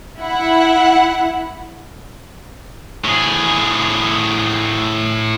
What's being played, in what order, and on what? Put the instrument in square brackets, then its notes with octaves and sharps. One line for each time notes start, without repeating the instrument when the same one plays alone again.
[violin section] E4 F#5
[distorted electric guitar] A2 G#4